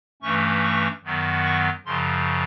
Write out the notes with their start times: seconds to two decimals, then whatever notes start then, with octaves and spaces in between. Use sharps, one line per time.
0.22 G2 E3 A3 C#4 C#6
0.63 C#6
1.04 F#2 D#3 F#3 B3
1.45 C#6
1.86 F#2 C#3 F3 C6